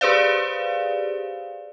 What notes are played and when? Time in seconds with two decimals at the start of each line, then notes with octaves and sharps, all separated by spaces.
0.01 G4 G#4 B4 C5 D5 F5